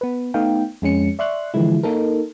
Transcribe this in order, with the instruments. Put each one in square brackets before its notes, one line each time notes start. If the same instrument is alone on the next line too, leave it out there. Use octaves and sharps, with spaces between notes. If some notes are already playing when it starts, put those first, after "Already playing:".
[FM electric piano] B3 B4
A3 B3 D#4 F5 G5
F2 G#3 C#4 C#7
D5 E5 C6 C#6 F#6
D3 E3 F3 G#3 E4
A#3 D#4 A4 A#4